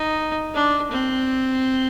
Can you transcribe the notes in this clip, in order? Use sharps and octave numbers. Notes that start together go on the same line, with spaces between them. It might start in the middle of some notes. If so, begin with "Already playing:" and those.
Already playing: D#4
D4
C4